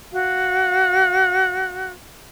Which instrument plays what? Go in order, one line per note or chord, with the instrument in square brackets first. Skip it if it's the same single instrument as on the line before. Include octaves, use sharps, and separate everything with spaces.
[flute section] F#4 F5